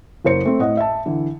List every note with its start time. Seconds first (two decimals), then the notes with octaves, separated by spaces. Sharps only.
0.25 F#1 A#4 C5 C#7
0.45 A3 C4
0.59 A2 D#5 F#5
0.77 E5 A5
1.06 D3 E3